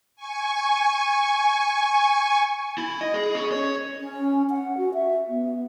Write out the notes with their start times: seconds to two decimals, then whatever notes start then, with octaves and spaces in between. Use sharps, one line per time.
0.16 G#5 C#6
2.78 E4
3.01 D#5
3.14 G#4
3.35 C#4
3.52 C#5
4.01 C#4
4.50 F#5
4.78 F#4
4.94 E5
5.28 B3